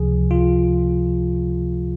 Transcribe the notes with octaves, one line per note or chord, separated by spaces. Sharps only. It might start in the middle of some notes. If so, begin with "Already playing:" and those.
Already playing: C#2 C3 F3 G#4
F4